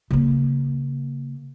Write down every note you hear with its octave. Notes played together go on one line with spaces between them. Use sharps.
C#3 A#3